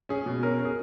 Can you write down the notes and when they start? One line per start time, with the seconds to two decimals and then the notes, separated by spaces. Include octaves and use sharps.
0.09 C#4 G#4
0.26 B2
0.43 C#4 A#4
0.59 C#4
0.65 G#4